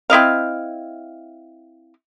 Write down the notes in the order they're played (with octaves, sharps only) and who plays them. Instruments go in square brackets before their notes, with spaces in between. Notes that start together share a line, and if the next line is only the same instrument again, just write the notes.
[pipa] C4 E4 D#5 F5